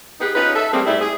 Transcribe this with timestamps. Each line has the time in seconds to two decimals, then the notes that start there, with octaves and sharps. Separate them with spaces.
0.20 B3 D#4 G4 G#4 B4
0.36 C#4 D#4 F4 B4
0.56 A4 E5
0.73 G3 A3 A#3 C4 G#4
0.87 G#2 G3 A3 E4
1.01 G#4